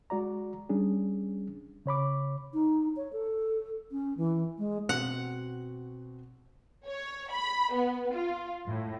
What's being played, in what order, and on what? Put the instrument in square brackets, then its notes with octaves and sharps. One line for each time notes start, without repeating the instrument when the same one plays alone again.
[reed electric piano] G#3 F#4 D5 A#5
G3 C#4 D4 G#4
C#3 C#5 B5 D6
[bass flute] D#4
C#5
A4
C#4
E3
G#3
[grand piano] B2 C4 F#4 [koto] F#5
[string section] C#5
B5
B3
F4
A2